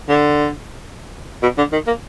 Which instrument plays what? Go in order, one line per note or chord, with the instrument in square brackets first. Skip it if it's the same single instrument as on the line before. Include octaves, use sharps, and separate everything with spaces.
[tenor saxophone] D3
B2
D3
D#3
A#3